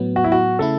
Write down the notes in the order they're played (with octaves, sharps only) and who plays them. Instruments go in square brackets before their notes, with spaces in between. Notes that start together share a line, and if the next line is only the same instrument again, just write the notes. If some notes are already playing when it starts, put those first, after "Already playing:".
Already playing: [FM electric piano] A2 F#3 B3
[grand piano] F#4
E4
F#4
[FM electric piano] C#3 A3 E4 [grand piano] A4